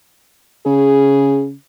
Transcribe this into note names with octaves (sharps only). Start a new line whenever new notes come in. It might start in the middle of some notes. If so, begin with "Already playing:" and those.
C#3 G#4